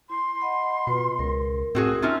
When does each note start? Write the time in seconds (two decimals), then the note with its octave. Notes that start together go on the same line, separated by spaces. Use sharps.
0.10 E4 C6
0.40 D#5 F#5 B5
0.87 B2 F4 B4
1.19 C#2 A#4
1.75 A2 C4 F#4 G#4
2.02 C4 C#4 D#4 F4 E5